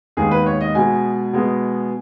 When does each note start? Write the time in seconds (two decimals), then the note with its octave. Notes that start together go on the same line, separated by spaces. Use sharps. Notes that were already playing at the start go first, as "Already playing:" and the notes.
0.17 D#2 D#3 G#3 B3 G#4
0.31 B4
0.46 C#5
0.61 D#5
0.75 B2 G#3 B3 G#5
1.33 B2 G#3 B3